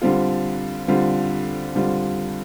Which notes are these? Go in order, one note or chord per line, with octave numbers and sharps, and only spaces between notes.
D3 G3 C4 F4
D3 G3 C4 F4
D3 G3 C4 F4